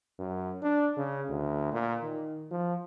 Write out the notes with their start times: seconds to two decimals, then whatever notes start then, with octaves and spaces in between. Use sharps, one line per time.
0.19 F#2
0.63 D4
0.97 C#3
1.29 D2
1.72 A#2
2.02 D#3
2.51 F3